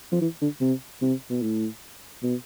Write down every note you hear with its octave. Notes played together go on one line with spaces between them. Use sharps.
F3
E3
D3
C3
C3
B2
A2
B2